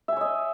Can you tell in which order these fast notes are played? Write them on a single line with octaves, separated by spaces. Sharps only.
E5 G#5 C#5 D#5